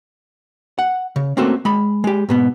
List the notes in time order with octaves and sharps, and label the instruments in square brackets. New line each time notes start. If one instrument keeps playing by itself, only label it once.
[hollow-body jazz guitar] F#5
C#3
A3 A#3 C4 C#4 F#4 A4
G#3 B5
G#3 G4
G#2 B2 B3